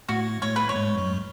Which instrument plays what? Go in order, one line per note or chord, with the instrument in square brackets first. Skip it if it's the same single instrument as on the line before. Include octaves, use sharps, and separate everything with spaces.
[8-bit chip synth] A2 A3 [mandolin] F#4
[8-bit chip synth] A2 A3 [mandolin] C#5
[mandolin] B4
[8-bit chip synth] A3 [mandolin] C#5
[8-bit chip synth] G#2 G#3
F#2 F#3